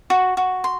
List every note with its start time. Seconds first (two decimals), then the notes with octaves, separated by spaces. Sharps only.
0.10 F#4
0.37 F#4
0.64 C6